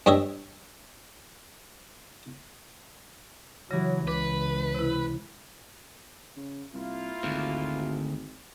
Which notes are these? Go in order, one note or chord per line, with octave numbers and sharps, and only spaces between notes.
G2 G3 C#5 D#5 E5
C#3 E3 F#3 A#6
C#2 B4 D6
C3 E4
C#3
C2 A#3 E4 F4
G#1 D2